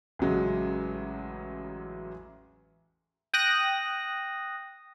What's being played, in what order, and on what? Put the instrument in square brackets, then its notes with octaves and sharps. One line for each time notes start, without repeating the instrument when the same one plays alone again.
[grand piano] A1 C#3 F#3 G#3
[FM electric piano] G5 D#6 F#6 A#6